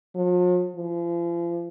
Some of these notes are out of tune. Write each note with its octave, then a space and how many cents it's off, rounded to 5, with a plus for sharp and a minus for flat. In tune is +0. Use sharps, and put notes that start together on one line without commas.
F3 +45
F3 -35